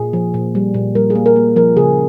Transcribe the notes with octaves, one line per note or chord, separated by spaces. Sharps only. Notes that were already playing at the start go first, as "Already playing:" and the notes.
Already playing: A#2 G#4
F3
A#2
G3
A#2
G3 A#4
G#4
A#3
A#4
A#3
F3 A#4
C#3 G#4